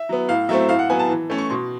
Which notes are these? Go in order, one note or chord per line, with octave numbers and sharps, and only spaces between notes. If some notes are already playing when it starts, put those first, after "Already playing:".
Already playing: E5
F#3 B3
A2 F5
F#3 A3 C4 E5
A2 F5
F#5
F#3 B3 G#5
A5
E3
A3 C#4
C#6
B2 C6